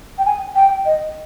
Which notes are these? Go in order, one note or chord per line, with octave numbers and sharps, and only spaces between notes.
G5
G#5
G5
D#5